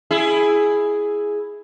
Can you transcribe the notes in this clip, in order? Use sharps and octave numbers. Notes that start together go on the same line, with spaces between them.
E4 G#4